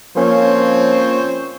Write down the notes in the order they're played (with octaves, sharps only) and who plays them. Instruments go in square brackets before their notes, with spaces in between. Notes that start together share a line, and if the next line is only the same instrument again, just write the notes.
[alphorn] F3 [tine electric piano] A#3 C#4 [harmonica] C4 C5 C#5